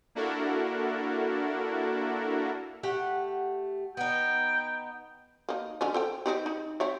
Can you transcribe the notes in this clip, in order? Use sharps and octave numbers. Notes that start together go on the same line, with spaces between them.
A#3 D4 E4 F#4 A4 A#4
A3 G4 F#5
B3 D#4 G5
A#3 D#4
D3 G#3 C#4
A4 C5 G5
C4 D#4 G4
D#4
C4 C#5 E5